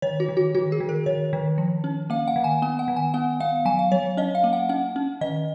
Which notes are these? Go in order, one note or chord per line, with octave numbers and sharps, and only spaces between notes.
D#3 C#5
F#4
D#3
F#4
D#3 F#4
G#4
D#3
A#4
D#3 C#5
D#3
F3
C#4
A#3 F5
F#5
D#3
G#5
B3 G#5
F#5
D#3
G#5
B3 F#5
B3 F5
F#3 G#5
F5
F#3 C#5
C#4 D#5
F5
A#3
F#5
C#4 F#5
C#4
D#3 D#5